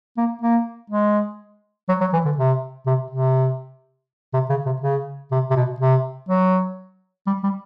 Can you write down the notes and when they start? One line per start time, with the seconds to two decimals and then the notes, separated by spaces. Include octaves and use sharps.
0.17 A#3
0.42 A#3
0.90 G#3
1.89 F#3
2.01 F#3
2.13 E3
2.25 D3
2.37 C3
2.86 C3
3.11 C3
4.33 C3
4.50 C#3
4.66 C3
4.82 C#3
5.31 C3
5.50 C3
5.56 B2
5.80 C3
6.29 F#3
7.27 G3
7.43 G3